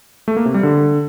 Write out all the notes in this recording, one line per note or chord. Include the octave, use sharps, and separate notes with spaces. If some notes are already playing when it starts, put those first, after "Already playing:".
A3
A#3
C3
G3
D3